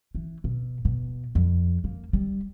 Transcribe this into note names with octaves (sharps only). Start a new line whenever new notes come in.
E3
B2
B2
F2
A#3
G3